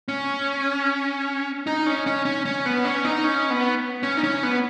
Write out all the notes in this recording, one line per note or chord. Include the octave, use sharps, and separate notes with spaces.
C#4
D#4
C#4
C#4
C#4
C#4
B3
C#4
D#4
C#4
B3
C#4
D#4
C#4
B3